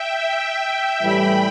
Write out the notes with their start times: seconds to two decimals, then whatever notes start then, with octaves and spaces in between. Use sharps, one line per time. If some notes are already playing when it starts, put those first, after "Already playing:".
Already playing: E5 G5
1.02 A2 E3 G3 G5 B5